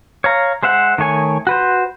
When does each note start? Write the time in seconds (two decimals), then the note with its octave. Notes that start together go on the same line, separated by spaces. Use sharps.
0.24 C#5 F5 A#5
0.63 G#3 C5 E5 F#5
0.98 D#3 A3 C#5 G#5
1.47 F#4 B4 C5